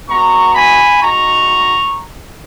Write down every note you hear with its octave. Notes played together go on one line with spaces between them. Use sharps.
G#3 B3 F#4 A#5 C#6
G#5 B5
G#3 D#4 F#4 A#5 C#6